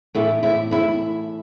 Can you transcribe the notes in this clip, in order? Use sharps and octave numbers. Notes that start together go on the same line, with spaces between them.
A2 E3 E4 E5
E4 E5
E4 E5